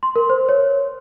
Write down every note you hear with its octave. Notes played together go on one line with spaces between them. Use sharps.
C6
A#4
C5
C#5